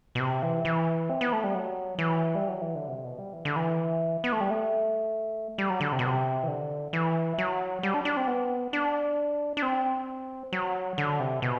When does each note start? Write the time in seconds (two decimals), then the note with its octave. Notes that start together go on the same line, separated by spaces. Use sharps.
0.15 B2
0.20 C3
0.43 E3
0.65 E3
1.10 C4
1.21 B3
1.33 A3
1.44 G3
1.55 F#3
1.99 E3
2.35 G3
2.49 F#3
2.62 E3
2.75 D3
2.88 C3
3.04 B2
3.18 G3
3.33 E3
3.45 D3
3.56 E3
4.24 B3
4.32 A3
4.41 G3
4.50 A3
5.58 G3
5.70 F#3
5.81 D3
5.92 C3
5.99 B2
6.06 C3
6.43 E3
6.48 D3
6.93 E3
7.38 F#3
7.83 G3
7.94 D4
8.05 D4
8.17 C4
8.27 B3
8.73 D4
9.57 D4
9.62 C4
10.53 F#3
10.98 D3
11.20 C3
11.42 B2